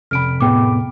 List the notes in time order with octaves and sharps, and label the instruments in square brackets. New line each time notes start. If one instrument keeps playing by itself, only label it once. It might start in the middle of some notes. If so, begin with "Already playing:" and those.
[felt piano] F1 B5 [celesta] F6 D7
[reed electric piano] A2 B3 [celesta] G#4 G5 D6